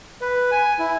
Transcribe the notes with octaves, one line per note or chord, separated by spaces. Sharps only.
B4
G#5
E4